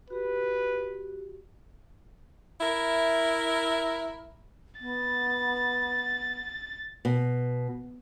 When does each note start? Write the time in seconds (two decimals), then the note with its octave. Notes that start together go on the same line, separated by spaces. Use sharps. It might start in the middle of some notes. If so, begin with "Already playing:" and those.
0.10 F#4 G4 B4
2.60 E4 A#4 E5
4.80 B3 A6
7.05 B2